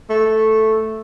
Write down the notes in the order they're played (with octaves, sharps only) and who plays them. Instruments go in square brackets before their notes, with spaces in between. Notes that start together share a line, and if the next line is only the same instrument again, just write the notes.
[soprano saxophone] A3